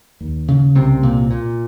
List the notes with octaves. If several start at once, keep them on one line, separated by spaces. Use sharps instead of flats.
D#2
C#3
C2 C3 C4
A#2
A#2